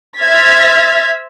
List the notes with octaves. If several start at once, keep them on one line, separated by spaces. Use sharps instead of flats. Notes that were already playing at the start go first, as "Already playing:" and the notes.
C5 E5 F6 G#6 A6 B6